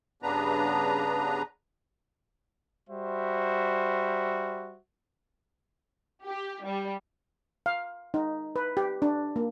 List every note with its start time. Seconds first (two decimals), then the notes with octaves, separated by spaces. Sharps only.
0.23 G2 C#3 B3 D4 B4 A#5
2.89 G3 F#4 C5 E5
6.24 G4
6.65 G3
7.66 F5
8.14 D#4
8.56 B4
8.77 G4
9.02 D4
9.36 A#3